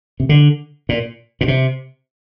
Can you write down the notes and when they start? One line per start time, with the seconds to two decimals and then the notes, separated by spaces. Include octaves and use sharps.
0.20 C3
0.29 D3
0.89 A#2
1.41 A#2
1.48 C3